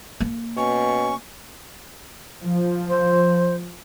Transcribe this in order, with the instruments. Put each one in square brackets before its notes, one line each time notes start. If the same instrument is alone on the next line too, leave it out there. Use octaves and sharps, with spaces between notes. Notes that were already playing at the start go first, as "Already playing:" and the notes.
[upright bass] A#3
[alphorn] B2 [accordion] C#4 [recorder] C#6
[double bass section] F3
[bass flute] C5